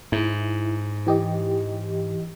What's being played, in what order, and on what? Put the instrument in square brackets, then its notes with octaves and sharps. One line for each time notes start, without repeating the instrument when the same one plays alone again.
[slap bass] G#2 [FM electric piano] E4
[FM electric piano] E3 G4 D#5